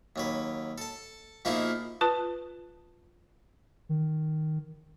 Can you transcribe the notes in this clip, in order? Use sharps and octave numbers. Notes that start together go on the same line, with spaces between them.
D#2 F#3 B4
A4 A5
B2 F3 A#3 D#4 E4 G#4
F4 B4 A5 F#6
D#3